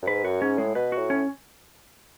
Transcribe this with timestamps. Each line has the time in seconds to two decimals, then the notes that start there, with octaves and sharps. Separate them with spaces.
0.02 F#2
0.07 G#2 B4
0.24 F#2 F#4
0.42 G#2 C#4
0.58 A2 G#3
0.75 B2 B4
0.92 F#4
0.98 A2
1.10 C#4